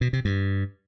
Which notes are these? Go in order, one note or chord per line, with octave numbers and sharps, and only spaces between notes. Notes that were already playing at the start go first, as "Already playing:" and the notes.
B2
C3
G2